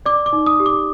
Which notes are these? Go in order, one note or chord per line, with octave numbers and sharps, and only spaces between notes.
D5 D6
D6
D#4
D#6
G4
D6